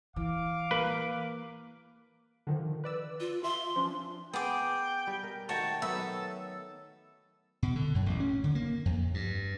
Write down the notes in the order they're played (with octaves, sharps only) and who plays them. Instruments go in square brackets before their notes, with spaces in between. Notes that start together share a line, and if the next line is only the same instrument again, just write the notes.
[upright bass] E3 [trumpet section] F5 D6
[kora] A#3 [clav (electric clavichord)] B4
[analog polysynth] D3 D#3 F3
B4 D5 E6
[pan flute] F4
[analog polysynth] F4 E5 [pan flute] C6
[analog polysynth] F3 C#4 D4
[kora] B3 [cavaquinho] G#4 D6 [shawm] G5
[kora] G3
A#4
[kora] D#3 A3 [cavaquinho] F#4 C#5 G5 [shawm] A5
[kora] F#3 B3 [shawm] A4 [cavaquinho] E5
[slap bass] B2
D3
F#2
A1
C#4
D3
A#3
F2
G2